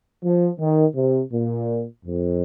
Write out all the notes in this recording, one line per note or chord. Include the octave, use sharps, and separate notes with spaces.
F3
D#3
C3
A#2
F2